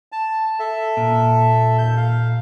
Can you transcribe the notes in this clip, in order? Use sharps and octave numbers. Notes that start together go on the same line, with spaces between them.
A5
A4 E5
A#2
D#2 G6
F5